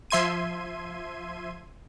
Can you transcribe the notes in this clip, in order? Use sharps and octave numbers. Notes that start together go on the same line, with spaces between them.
F3 E5 C6 G#6 D#7